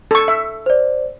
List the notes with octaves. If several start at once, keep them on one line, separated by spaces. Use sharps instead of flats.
A4 C#6
E5
C5 D5